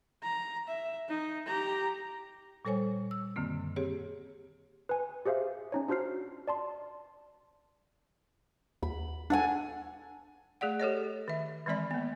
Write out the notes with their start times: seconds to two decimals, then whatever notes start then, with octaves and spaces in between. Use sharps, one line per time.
0.23 A#5
0.68 E5
1.09 D#4
1.46 G4 A#5
2.65 A#2 G3 A4 C5 C#5 G#5
3.11 E6
3.36 F#2 D3 D#3 A#3 C4
3.76 C4 G4 G#4 C#5
4.89 B4 G#5
5.26 G4 G#4 C5 E5 F5
5.72 C#4 D#4 C#5
5.88 D4 F4 F#4 C5 F6 C7
6.47 D5 A5 C6
8.83 D#2 B5
9.30 D4 A4 F#5 G#5
10.61 A3 G#4 D5 F#5
10.80 G4 A4 C#5 D#5
11.28 D#3 E5
11.66 D#3 E3 G#3 C4 D5 B5
11.91 A#3 B3